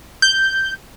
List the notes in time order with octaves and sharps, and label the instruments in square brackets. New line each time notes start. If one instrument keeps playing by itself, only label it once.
[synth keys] G6